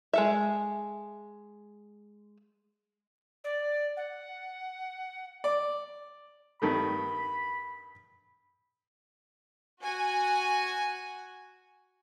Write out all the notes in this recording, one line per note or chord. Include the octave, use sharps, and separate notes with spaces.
G#3 A4 E5
D5
F#5
D5
G2 D#3 A3 B5
F#4 G#5